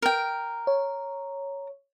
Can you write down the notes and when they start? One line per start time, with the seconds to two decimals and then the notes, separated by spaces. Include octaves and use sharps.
0.02 A#4 G5
0.67 C#5